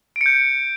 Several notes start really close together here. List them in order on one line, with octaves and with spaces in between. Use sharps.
D7 C#7 G6